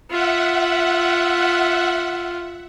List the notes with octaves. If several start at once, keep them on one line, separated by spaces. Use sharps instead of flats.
F4 E5 F#5